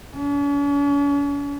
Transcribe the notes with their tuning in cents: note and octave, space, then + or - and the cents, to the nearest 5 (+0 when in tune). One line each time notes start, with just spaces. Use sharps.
C#4 +45